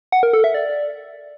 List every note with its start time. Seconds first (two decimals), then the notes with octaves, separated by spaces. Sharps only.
0.12 F#5
0.23 A#4
0.33 A4
0.44 E5
0.54 D5